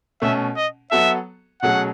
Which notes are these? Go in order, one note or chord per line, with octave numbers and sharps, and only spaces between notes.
B2 A3 C#4 E5
D#5
F#3 B3 F#4 A4 E5
B2 F#3 A3 C#4 G#4 F#5